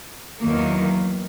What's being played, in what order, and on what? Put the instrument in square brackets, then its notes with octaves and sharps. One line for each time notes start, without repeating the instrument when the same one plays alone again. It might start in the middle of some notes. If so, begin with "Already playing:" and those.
[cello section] E2 D#3 F#3 A#3